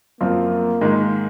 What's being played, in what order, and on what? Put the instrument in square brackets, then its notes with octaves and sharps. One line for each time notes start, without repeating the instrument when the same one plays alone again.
[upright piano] F#2 F3 C4 F4 [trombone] A#3
[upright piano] G#2 D#3 G#3